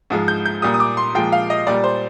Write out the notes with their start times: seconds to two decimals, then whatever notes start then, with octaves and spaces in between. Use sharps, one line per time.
0.10 G#2 F3 G#3
0.28 G6
0.45 G6
0.62 A#2 G3 D#6
0.74 D#6
0.80 D6
0.97 C6
1.15 A#2 F3 G#3 G5
1.32 F5
1.50 D#5
1.67 A#2 G3 D5
1.84 C5